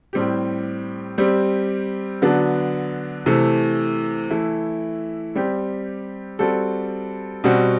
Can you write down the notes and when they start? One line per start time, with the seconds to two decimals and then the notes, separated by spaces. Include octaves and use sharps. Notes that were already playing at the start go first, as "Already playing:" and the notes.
0.13 A2 G3 C4 G4
1.18 G3 C4 G4
2.22 D3 F#3 B3 D4
3.26 C3 E3 A3
4.30 E3 A3 E4
5.36 G3 C4 G4
6.39 G3 C4 F#4 A4
7.44 B2 G3 C4 F#4